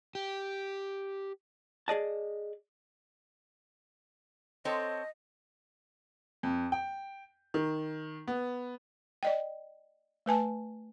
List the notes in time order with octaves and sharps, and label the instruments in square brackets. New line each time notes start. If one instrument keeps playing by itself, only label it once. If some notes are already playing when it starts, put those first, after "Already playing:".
[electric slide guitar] G4
[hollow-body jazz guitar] G#4 D5 D#5 A5
[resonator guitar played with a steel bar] C4 A4 C#5 [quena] D#5
[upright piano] F2
G5
D#3
B3
[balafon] D5 D#5 G5
A3 B4 G#5 A5